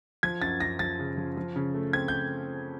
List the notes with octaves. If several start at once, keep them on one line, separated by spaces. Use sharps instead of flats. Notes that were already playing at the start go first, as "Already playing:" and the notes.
F3 G#6
F#2 A6
F#2 A#6
F3 A6
C#3
F3
F3
C#3
A3
C4 G#6
G6